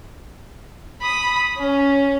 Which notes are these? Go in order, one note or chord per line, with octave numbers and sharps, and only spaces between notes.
B5 D#6
C#4